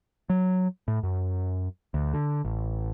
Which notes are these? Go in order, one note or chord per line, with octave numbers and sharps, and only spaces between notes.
F#3
A2
F#2
D2
D3
A1